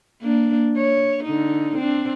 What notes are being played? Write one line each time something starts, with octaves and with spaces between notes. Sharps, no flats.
A#3 D4
C#5
D3 D#4
C4 D4